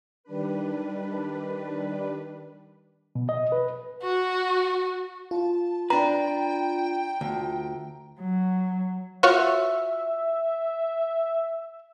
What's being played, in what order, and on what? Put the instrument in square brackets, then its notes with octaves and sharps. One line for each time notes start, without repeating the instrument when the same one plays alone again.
[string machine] D#3 G3 D4 B4
[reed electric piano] B2
D#5
B4
[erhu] F#4
[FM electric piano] F4 [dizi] A5
[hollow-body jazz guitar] D4 B4 [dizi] G5 [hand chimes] A#5
[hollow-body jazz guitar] D2
[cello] F#3
[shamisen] F4 F#4 C#5 [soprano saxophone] E5